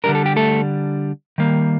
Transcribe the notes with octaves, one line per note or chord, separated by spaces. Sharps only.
D3 G3 D4 A#4
A4
G4
A3 A4
D#3 G3 A#3